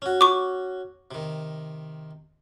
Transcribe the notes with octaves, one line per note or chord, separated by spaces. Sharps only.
C#4 F#4
C#6 D6
C3 D#3